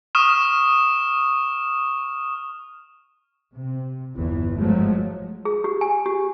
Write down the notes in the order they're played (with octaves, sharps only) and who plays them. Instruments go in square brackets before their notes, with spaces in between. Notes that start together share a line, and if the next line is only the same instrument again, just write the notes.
[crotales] C#6 D#6 F6 E7
[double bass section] C3
G1 E2 E3
G#2 F3 F#3 G#3 A3
[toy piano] G#4
G4
G#5
G4